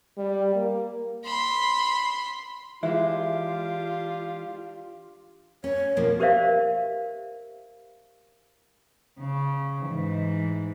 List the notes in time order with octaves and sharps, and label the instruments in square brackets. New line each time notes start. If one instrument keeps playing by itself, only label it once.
[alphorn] G3
A#3
[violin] B5 C6
[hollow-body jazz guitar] E3 G#3 [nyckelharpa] D4 G4 [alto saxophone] F4 [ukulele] E5
[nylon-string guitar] C#4 [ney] C#5
[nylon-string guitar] B2 F3 A#3
[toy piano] G4 A#4 C5 D5 E5 F5
[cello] C#3
G#2 E3